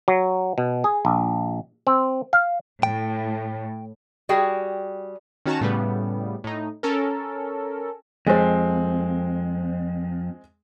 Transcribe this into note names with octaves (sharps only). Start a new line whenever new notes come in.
F#3
B2
G#4
A#1
C4
F5
A2 G5
G3 F#4 G#4 G5
D#3 C#4 F#4 A5 A#5 E7
A2 C#3 G3 B3
A2 D#4
C#4 A4 A#4
F2 G#3 C4